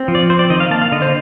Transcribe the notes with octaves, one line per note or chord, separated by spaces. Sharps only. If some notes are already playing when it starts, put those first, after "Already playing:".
Already playing: C4
F3
D5
C4 C5
D5
D#3 D#5
F5
A#3 A5
F5
D3 D#5
C5